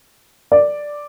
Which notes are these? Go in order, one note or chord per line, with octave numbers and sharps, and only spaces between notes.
D5